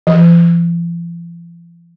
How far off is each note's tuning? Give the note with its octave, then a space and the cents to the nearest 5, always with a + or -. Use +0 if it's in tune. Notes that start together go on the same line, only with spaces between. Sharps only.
F3 -45